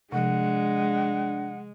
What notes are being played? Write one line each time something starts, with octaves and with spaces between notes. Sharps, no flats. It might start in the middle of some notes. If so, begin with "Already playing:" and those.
C3 F3 G#3 D4 F#5